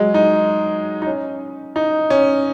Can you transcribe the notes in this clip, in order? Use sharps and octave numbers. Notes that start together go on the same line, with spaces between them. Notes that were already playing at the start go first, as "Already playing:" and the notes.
Already playing: F#3 G#3
D#4
D#4
C#4
D#4
C#4